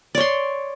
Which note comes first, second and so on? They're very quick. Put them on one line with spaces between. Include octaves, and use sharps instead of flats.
D5 C#5 C6